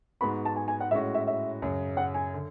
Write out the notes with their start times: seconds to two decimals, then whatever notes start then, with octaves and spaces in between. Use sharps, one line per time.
0.21 G#2 G#3 B3 F#4 B5
0.45 A5
0.56 G#5
0.68 G#5
0.80 F#5
0.91 A2 G#3 C#4 F#4 E5
1.15 E5
1.27 E5
1.62 F#2 C#3 F#3
1.97 F#5
2.14 G#5
2.34 D3